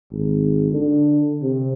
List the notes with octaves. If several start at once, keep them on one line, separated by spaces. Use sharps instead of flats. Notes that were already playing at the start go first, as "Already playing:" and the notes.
G#1
D3
C3